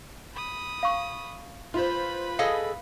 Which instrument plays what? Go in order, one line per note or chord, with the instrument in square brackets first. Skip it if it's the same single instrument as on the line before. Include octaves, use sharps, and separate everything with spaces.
[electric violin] B5 D#6
[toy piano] F5 C#6
[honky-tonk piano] F4 C5 [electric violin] B4 B5
[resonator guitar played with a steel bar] G#4 A4 D#5 [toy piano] F5